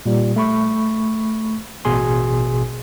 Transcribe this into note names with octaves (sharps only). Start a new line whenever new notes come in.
A#2 G3
A3 B5 C#6
A1 B2 G#4 G#5 C6